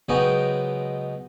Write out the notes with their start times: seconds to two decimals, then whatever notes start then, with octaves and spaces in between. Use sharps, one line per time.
0.09 C#2 F#3 G#3 B3 D#4 G5